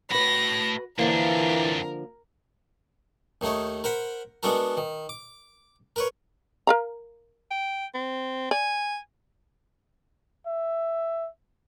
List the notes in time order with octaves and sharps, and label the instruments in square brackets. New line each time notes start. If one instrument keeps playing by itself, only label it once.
[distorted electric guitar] A2 B5 [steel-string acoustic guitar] F#4 B4 [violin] A#6
[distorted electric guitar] F2 D4 [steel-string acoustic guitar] D3 F3 A#3 [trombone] E3 [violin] A#4
[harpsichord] D#2 D#3 A3 D#4 C#5
A#4 C5 F#5 B5
G#3 B3 D4 F#4 A4 A#4
D#3
D6
A#4 B4 C#5
[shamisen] A#4 F5 A#5
[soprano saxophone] G5
C4
[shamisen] D5 [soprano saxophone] G#5
[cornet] E5